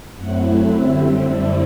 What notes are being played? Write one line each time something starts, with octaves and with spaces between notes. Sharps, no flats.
F#2 F#3 A3 C4 E4 F#4 F#5
D3 G3 C4 E4 E5
F#2 D3 A3 C4 D4 E4 D5